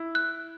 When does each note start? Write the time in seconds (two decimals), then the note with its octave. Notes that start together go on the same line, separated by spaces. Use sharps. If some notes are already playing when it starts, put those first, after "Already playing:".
Already playing: E4
0.15 F#6